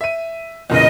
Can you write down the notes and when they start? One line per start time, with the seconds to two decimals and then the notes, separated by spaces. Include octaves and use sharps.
0.01 E5 D#7
0.70 E2 A#2 C#3 D#5